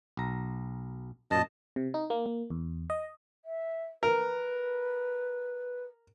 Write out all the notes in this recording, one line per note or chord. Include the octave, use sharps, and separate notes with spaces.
B1 A#5
F#2 A#2 D#5 A5
C3
D#4
A#3
A#3
E2
D#5
E5
A#4 B4